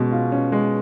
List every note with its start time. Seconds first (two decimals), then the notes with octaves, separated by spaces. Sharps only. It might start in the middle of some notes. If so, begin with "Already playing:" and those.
Already playing: B2 G#3 C#4
0.12 F4
0.32 C#4
0.52 G#3